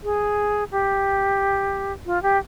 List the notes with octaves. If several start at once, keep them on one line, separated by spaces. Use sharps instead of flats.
G#4
G4
F4
G4